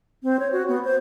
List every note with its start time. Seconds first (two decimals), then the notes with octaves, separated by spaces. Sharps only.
0.23 C4
0.39 C#5
0.52 F#4
0.68 B3
0.85 C5